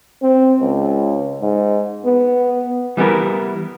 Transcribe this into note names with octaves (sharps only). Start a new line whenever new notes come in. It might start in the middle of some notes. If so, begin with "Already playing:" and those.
C4
C#2
G#2
B3
E3 G3 B3 E4 A#4